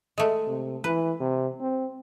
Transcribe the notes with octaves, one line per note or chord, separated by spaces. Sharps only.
G#3 A3
C3
E3 B4
C3
C4